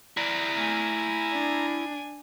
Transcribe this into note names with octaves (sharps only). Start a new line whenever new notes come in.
E4 D5 A#5
A3 G#5
D4